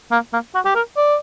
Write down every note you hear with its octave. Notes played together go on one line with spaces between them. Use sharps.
A#3
A#3
F#4
G4
A#4
D5